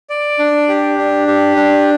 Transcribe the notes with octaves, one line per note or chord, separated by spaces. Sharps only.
D5
D4
G4
D4
G4
D4